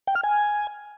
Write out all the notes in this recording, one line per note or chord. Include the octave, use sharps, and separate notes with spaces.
G5
F6
G#5